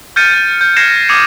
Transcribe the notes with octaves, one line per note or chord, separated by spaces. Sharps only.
F6 G6 A6 C#7 D#7
G6
G6
F6 G#6 A#6 C7 C#7 E7
A#6
D6 D#6 G#6 C#7 D#7